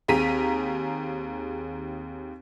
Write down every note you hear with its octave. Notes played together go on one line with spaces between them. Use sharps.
D#2 C4 G#4 A#5 B6 D#7